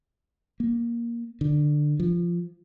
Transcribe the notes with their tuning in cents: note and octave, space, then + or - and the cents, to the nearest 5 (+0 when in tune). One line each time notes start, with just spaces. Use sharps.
A#3 +10
D3 +15
F3 -15